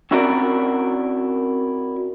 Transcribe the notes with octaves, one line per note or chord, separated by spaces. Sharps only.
C4 C#4 E4 F#4 A#4 D5